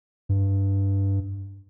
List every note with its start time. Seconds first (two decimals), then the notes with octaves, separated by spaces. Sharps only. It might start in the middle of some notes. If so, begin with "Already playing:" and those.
0.29 G2